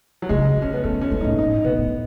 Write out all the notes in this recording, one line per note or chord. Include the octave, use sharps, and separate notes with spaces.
F#3
C#3 G#3
D#3
C#4
B3
E3 A3
C#4
G#3
A2 D#4
G#2 D#4
A2
B2 B3
A2